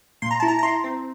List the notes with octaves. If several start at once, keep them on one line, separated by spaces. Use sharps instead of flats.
A#2 C6
A#5
E4 A5
A#5
A#5
E4 C6
C4